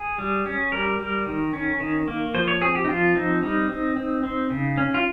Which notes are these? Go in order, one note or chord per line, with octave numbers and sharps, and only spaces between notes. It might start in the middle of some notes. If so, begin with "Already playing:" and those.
Already playing: G#4
G3
C#4
G3 A#4
G3
D#3
C#4
D#3
A#3
F3 C5
C#5
C4 G#4
G4
D#4
F3 F4
C4 D#4
G3 D#4
C4
C4
C4
C#3
C#4
F4